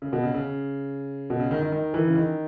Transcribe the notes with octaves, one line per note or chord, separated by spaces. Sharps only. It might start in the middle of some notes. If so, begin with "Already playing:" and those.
C#3
B2
C#3
C#3
B2
C#3
D#3
D#3
D#3
E3
C#3
D#3